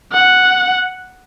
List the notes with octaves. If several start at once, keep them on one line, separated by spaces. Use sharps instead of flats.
F#5